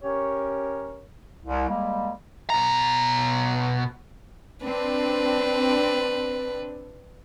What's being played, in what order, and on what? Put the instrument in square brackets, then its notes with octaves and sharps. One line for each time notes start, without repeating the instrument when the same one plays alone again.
[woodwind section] C#4 G4 A#4 C#5
C2
G3 G#3 A#3
[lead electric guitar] B2 A#5
[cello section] C4 D4 [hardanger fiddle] B4